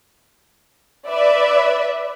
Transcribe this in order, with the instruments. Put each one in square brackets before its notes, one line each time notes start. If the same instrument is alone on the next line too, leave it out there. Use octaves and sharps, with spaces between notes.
[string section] B4 D5 E5